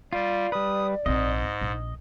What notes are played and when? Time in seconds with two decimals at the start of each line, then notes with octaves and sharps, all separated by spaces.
0.13 G3 F4 D5
0.52 G3 B4 D#6
1.06 A#1 G#2 C4 D#5
1.61 A#1